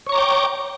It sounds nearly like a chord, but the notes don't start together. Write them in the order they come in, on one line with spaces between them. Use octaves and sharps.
C#5 C#6 A#5 D6 G5